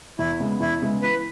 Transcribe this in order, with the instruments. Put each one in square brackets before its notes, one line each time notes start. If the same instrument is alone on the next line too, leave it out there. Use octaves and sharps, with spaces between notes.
[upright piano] E2 [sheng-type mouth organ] E4
[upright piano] C#3 G#3 B3
[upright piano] E2 [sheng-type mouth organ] E4
[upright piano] C#3 G#3 B3
[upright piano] E3 [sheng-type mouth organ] B4